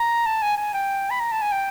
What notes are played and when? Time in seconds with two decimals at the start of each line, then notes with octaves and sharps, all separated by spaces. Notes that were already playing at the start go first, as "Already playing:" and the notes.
Already playing: A#5
0.26 A5
0.42 G#5
0.57 G#5
0.74 G5
1.11 B5
1.20 A#5
1.32 A5
1.41 G#5
1.52 G5